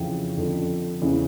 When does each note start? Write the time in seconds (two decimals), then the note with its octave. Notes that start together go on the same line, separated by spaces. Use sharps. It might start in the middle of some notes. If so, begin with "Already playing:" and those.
Already playing: F2 C#3 E3 F5 G5
0.37 F2 D3
1.02 E2 C#3 E3